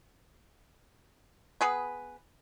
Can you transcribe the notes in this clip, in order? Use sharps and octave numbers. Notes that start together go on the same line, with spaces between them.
B3 G#4 B4